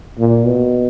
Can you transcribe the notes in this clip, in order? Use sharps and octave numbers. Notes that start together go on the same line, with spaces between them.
A#2
B2